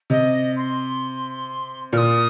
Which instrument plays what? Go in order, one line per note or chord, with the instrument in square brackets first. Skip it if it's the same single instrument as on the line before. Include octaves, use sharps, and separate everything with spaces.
[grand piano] C3 [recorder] D#5
[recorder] C6
[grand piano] A#2 [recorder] F6
[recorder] D#6